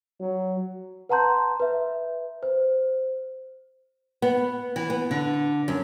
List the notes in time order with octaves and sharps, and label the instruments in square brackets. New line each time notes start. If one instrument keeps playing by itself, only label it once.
[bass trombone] F#3
[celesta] B4 F#5 A5 A#5 C6 G6
B4 E5
C5
[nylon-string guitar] B3
E3
B3
D3
F#2